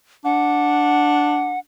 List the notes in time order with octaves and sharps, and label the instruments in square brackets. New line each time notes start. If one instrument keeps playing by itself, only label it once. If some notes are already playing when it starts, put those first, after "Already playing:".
[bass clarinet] D4 [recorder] F#5